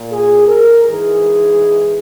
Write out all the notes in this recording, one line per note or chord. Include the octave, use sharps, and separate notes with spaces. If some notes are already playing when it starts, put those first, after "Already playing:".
Already playing: A#2
G#4
A#4
G#2 E3 G#4